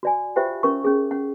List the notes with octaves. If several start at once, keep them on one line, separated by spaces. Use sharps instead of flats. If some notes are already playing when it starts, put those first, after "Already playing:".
F#4 D5 G#5
F4 G4 C5 E5 F5 G5
C#4 A#4 C#6
C#4 G#4
C#4 F#5